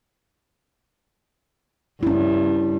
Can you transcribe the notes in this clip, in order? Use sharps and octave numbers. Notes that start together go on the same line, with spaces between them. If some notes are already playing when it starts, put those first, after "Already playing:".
G2 C#4 E4